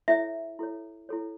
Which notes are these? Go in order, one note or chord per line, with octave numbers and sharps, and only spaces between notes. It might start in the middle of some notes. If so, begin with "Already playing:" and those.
E4 A4 C#5 E5
E4 A4 C#5
E4 A4 C#5